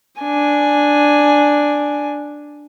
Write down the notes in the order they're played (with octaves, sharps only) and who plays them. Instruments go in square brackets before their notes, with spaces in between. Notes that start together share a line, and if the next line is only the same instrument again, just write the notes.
[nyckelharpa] D4 G#5